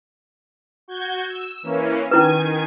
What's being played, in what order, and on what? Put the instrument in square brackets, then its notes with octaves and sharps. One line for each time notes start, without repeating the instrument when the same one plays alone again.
[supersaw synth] F#4 G6 G#6
E6
E3 A#3 C#4
[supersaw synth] D#3 G#5 [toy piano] C#4 E4 B4